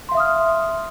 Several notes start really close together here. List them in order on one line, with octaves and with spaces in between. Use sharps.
C6 F5 E5 D#6 F6